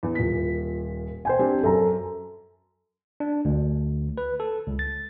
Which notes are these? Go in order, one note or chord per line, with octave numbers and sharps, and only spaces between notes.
E2
D#1 A#2 B6
C5 G5 G#5
C4 D4 G4
F#2 A4 A#5
D4
D2
B4
A4
C#2
A6